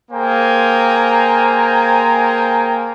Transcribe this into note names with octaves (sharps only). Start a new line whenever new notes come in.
A#3 G#4 C5 G5 G#5 A#5